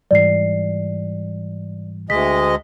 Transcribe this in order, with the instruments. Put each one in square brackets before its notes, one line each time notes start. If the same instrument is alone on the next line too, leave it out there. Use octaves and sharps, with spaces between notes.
[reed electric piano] G#2 E3 G3 [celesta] D5 C7
[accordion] D2 G#3 D#5 [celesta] B6